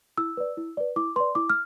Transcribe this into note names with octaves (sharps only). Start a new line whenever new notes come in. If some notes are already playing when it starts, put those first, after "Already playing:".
E4 E6
B4 D5
E4
B4 D5
E4 D6
B4 D5 C6
E4 D6
F6